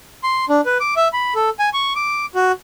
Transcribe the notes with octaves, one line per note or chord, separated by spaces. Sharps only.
C6
D4
B4
D6
E5
B5
A4
G#5
C#6
D6
F#4